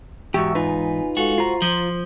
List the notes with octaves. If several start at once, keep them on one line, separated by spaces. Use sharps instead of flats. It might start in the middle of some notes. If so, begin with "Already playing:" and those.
E2 G#2 F#4 G4 E5 C#6 E6
D#4 F4 B4 G#5
G#3 F#4 A4 F5
F4 C5 A#5
F3